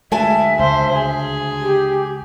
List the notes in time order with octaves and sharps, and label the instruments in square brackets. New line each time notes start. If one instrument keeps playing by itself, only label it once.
[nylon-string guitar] D2 G#5 A5 [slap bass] G#3 [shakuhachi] E5
[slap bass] C#2 [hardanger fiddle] C5
[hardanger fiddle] G#4
[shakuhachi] G4